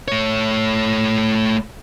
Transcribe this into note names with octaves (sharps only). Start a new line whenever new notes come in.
A3 C#5